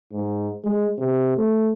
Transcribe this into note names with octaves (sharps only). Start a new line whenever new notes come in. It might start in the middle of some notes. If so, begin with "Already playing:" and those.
G#2
G#3
C3
A3